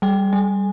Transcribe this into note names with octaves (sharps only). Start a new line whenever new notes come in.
G3 G5
G3 G#5